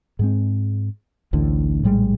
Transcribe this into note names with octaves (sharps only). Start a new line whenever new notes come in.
G#2 G#3 C4
A1 D2 A2 D3
A#1 A2 G3 G#3